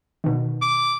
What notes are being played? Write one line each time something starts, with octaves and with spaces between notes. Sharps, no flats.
B2 D#3
D6